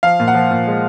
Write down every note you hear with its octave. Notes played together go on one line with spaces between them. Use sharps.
F3 F5
A#2
F#5
F3
A#2
G#3